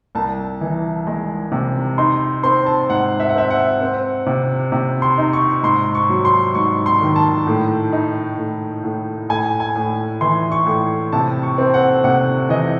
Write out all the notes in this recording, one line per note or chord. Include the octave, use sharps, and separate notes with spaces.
C2 A5
E3
G#3
C3
D#4 C6
C4 C6
A5
G#2 F#5
E5
F#5
C4 E5
F#5
C4
C3
C3
C6
D#4
C#6
G#2 C6
C#6
F#3
C6
G#2 C#6
C6
D#3
A5
A2
D#4
A2
A2
A2 G#5
G#5
A2
E3 C6
C#6
A2
C3 A5
C#6
C4
F#5
C3 F#5
E3 D#5